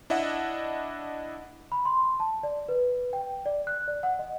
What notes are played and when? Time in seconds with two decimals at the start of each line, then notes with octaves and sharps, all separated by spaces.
0.10 D4 E4 D#5 E5 F#5
1.72 B5
1.85 C6
2.20 A5
2.43 D5
2.69 B4
3.13 G5
3.46 D5
3.67 F#6
3.88 D5
4.03 F#5
4.19 D#5